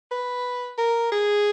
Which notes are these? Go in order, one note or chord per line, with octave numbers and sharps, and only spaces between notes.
B4
A#4
G#4